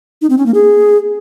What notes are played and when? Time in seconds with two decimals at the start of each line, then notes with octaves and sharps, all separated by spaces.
0.22 D#4
0.30 C4
0.38 C#4
0.46 A#3
0.54 G#4